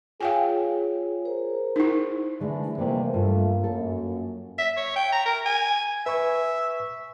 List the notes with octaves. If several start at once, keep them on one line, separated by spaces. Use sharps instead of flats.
F4 G#4 C#5 F5 G5 G#5
G#4 A#4 C5
D#4 E4
D3 E3 G#3 A3 D4 E4
F2 C3 E3 G3 A3 A#3
G2 A3 F4
F#2 A4
E5
C#5
G5
A#5
A#4
G#5
B4 E5 G#5 C#6